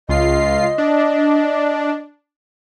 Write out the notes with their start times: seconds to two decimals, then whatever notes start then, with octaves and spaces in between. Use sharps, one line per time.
0.09 C#2 F4 D#5 C7
0.78 D4